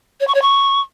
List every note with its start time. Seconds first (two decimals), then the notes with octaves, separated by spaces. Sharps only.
0.20 C#5
0.27 C#6
0.34 C#5
0.42 C#6